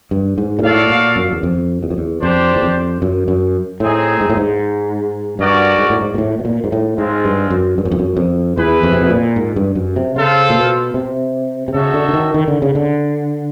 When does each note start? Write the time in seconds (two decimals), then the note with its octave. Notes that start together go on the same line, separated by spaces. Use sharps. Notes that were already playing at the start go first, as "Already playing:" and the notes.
0.11 G2
0.38 G#2
0.59 A#2
0.63 A2 F#4 A4 D5 F5
0.90 A#2
1.16 F#2
1.32 E2
1.43 F2
1.83 E2
1.90 F2
1.98 E2
2.22 F2 D4 G4 C5
2.56 E2
2.62 F2
3.02 F#2
3.28 F#2
3.80 A2 C4 D#4 G#4
4.21 G#2
4.30 A2
4.37 G#2
5.39 G2 C#4 F#4 A#4 D5
5.79 G#2
5.90 A2
6.01 G#2
6.14 A#2
6.18 A2
6.39 B2
6.45 A#2
6.64 G#2
6.72 A2
6.98 G#2 G#3 C4 F4
7.25 G2
7.50 F#2
7.78 G2
7.85 F#2
7.91 F2
7.99 F#2
8.17 F2
8.57 E2 E4 G#4 B4
8.83 F2
8.93 C3
9.02 B2
9.10 A#2
9.36 G#2
9.56 G2
9.75 F#2
9.96 C3
10.15 C#3 F4 A4 C5 F5
10.50 A#2
10.56 B2
10.94 C3
11.68 C3
11.74 C#3 D#4 F#4 A4 C#5 E5
11.94 D3
12.09 D3
12.13 D#3
12.34 D#3
12.48 D3
12.62 C#3
12.75 D3